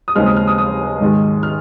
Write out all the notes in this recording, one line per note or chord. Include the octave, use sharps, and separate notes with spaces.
D#6
D#2 C#3 G#3 C4 D#4 F6
D#6
F6
D#6
D#6
G#2 D#3 G#3
F6